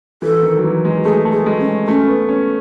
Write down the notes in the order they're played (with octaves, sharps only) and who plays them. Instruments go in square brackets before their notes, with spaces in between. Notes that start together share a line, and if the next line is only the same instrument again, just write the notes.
[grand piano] E3 [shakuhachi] A4
[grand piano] D#3
F#3
E3
G#3
[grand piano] A3 [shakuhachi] G#4
[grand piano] A3
[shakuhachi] G#4
[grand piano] G#3
[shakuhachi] C#4
[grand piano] A3 [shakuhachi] C#4
[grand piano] B3
C#4